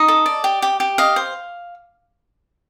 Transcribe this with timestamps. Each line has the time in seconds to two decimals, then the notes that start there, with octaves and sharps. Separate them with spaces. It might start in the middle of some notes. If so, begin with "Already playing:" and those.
Already playing: D#4 D#5
0.08 A4
0.26 D5
0.44 G4
0.62 G4
0.80 G4
0.98 D#5 F5
1.16 C5